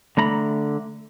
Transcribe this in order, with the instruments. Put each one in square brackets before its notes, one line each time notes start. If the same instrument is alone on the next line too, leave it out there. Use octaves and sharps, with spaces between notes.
[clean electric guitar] D3 A3 A#5 B5